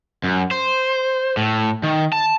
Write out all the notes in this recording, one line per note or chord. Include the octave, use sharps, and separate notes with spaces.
F#2
C5
A2
D#3
A5